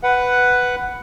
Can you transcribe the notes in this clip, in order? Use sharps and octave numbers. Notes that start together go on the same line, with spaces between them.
B4 F#5